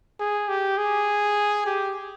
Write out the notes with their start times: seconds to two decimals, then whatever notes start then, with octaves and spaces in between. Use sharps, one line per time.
0.19 G#4
0.49 G4
0.78 G#4
1.66 G4